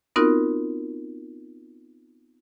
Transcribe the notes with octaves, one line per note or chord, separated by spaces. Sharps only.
B3 C4 D#4 F4 F#4 A#4